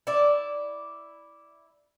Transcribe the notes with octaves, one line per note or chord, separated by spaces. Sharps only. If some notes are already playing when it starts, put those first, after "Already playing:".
E4 D5